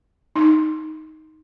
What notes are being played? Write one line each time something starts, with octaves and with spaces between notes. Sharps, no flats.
D#4